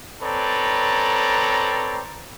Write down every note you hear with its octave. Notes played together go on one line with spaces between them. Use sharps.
C4 A4 B4 C#5 D5 A#5